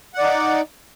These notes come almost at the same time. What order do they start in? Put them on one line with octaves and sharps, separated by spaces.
F#5 D5 D#4